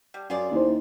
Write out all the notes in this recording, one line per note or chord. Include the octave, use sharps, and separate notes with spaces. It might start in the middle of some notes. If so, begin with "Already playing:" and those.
G3
F#2 F4 G#4 D5
D#2 E4 C5